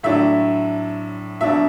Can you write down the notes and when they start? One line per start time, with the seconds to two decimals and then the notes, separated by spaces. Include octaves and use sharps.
0.03 A2 F#3 D4 E5
1.41 B2 F#3 D4 E5